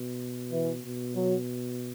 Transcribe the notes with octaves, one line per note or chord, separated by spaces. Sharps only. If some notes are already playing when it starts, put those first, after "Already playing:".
Already playing: B2
E3
B2
F#3